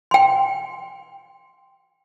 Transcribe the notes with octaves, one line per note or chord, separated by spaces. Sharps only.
G5 C6